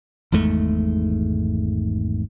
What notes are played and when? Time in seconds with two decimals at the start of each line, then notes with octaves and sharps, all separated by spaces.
0.32 G#1 E2 G#2 A3